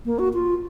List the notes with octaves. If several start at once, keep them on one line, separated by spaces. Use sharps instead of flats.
A#3
F#4
F4